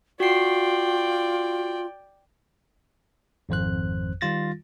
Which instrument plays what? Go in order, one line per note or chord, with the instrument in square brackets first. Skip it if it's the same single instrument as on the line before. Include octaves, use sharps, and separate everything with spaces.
[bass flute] F4 [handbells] F#4 C7 [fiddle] D5 G5
[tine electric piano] G#1 F2 C5 F#6
D#3 G3 F4 A6 A#6